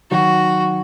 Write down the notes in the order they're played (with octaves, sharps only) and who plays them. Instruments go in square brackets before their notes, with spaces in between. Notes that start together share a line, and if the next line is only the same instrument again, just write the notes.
[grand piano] D#3 F#3 [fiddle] F#4